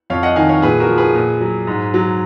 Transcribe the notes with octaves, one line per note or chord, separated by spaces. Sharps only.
F2 C#5 F5
D#5 F#5
D#3 F5 G#5
C#5 F5
A#2 G#4 B4
F#4 A#4
F3
G#4 B4
A#2
F#3
G#2
F#3